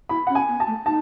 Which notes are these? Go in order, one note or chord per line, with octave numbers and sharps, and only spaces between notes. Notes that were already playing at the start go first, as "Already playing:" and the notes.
E4 B5
C#4 F#5
G#5
B3
A5
A3
D#4 A5